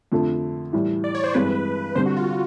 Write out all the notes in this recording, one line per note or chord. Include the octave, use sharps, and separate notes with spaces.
F2 D3 F3 A3
A2 E3 G3
D5
C#5
C5
G2 E3 G#3 C4 B4
D3 G3 C4 C5
F#4
F4
F4